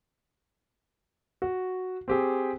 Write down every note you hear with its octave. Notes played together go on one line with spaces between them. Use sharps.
F#4
C4 G4 G#4